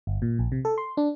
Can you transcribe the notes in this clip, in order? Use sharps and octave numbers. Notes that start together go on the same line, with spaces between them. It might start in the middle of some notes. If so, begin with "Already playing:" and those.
G1
A#2
A#1
C3
A4
C6
D4